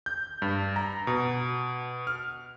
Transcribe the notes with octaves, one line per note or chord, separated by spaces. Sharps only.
G6
G2
A#5
B2
F6